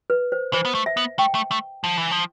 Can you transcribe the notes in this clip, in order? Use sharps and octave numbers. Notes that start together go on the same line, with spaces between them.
B4
C5
E3 C5
B3
A3
E5
B3
A3 G5
A3
A3
F3
E3
F3